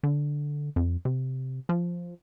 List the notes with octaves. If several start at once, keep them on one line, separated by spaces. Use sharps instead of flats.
D3
F2
C3
F3